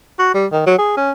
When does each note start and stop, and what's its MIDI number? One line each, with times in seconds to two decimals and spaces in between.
0.19 0.31 66
0.34 0.46 55
0.52 0.63 51
0.66 0.77 54
0.78 0.95 68
0.97 1.11 61